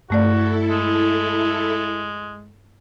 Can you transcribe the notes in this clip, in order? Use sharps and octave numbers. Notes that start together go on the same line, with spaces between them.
G2 A3 E4 F#4 A4 D5
G#3